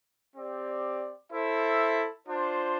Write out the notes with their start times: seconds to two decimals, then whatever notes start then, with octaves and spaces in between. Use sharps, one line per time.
0.35 C4 G4 D5
1.31 E4 A4 C5 E5
2.27 D4 F4 C5